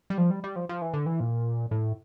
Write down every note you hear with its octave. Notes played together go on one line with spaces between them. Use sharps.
G3
F3
G3
G3
F3
F3
E3
D3
E3
A#2
A2